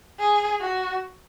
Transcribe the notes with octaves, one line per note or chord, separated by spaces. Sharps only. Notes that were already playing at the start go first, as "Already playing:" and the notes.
G#4
F#4